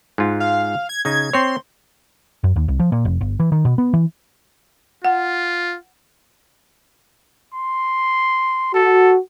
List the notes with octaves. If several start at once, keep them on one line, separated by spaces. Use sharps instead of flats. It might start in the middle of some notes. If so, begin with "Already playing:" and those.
G#2 F4
F5
G#6
C#3 D#4 G#6
C4 C#5 C6
F#2
D#2
C2
F3
A#2
F1
G1
E3
D#3
B2
B3
E3
F4 F#5
C6
F#4 A4